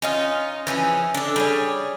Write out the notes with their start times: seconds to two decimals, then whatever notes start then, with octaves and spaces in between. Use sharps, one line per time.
0.02 C#4 D#4 F4
0.67 E3 F3 C#4 G#4
1.14 D4 A4
1.36 G3 G#4 C#5